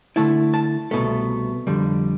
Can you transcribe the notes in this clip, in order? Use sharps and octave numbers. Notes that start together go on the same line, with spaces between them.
D3 A3 E4 A5
A5
C2 B2 A3
F2 D3 G3